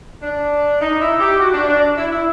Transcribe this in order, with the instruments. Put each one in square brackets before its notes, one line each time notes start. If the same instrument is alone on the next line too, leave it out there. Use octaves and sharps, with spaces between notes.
[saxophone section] D4
D#4
E4
G4
F#4
D4
D4
E4
E4